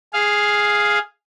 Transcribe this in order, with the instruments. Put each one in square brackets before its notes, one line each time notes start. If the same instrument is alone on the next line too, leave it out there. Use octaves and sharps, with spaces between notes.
[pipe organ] G#4 F5